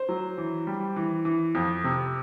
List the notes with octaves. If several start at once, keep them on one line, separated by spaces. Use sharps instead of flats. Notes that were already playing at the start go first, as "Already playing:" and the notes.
Already playing: C5
F#3
E3
G3
E3
E3
F2
C3